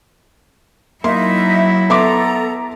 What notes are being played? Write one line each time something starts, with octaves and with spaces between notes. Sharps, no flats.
F#3 A#3 D#4 E4 E5 C6
B3 A4 E5 A#5 C6 D6